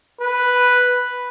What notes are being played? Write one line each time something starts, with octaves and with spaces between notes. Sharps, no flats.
B4